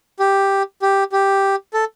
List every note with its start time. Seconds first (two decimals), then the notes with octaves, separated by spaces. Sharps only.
0.19 G4
0.82 G4
1.12 G4
1.74 A4